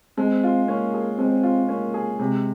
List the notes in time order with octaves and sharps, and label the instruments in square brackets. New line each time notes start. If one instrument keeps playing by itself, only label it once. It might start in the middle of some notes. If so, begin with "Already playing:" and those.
[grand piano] G#3 [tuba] C4
[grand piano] F4
[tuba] A#3 [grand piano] C#4
[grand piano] G#4
[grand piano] G#3 [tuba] C4
[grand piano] F4
[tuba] A#3 [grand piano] C#4
[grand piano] G#4
[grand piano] C3 [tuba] G#3